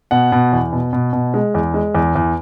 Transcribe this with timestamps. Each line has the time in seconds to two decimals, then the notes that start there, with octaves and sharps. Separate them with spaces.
0.11 B2 F#5
0.32 B2
0.53 E2
0.73 B2
0.93 B2
1.13 B2
1.34 G#3
1.55 E2
1.74 G#3
1.95 E2
2.16 E2